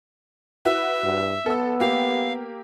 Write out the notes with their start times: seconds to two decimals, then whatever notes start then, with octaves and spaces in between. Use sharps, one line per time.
0.65 E4 F#4 B4 E5
1.04 G2
1.46 B3 A4 E6
1.80 A#3 G4 F5